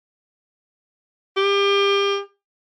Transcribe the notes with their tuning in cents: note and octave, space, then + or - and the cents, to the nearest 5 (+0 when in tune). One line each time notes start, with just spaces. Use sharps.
G4 +30